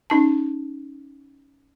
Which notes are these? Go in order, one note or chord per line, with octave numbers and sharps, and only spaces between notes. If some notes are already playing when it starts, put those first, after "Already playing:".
C#4 D#4 A5